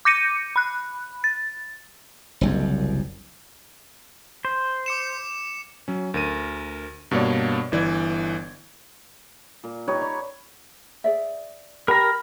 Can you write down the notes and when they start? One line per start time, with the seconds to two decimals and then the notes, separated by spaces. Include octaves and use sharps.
0.05 D6 G6 A#6 C#7 D#7
0.56 B5 F#6
1.24 A6
2.41 F#1 C2 F#2
4.45 C5
4.86 D6 C#7 E7
5.88 F#3 C#4
6.14 D2 A#4 D#7
7.11 G2 B2 A#3 D4 C#5 D5
7.72 G1 E3 D5 G#6
9.64 A#2
9.88 D#4 G4 B4 C#5
10.01 C#5 D5 C#6
11.04 G#4 D5 E5
11.88 G4 A#4 A#5 B5